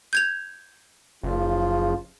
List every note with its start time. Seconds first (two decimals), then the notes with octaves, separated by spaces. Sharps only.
0.13 G6 G#6 F7
1.23 F#1 C#3 F3 F4